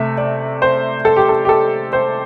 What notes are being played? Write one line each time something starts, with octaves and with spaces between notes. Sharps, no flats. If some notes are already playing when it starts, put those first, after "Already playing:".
Already playing: C3 A3 E5
D5
C5
A4
G4
A4
G4
A4
C5